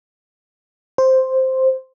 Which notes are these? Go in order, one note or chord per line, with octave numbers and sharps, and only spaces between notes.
C5